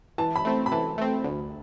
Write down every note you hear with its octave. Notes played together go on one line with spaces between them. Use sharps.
E3 A5
B5
A3 C4
B5
E3 A5
A3 C4
D2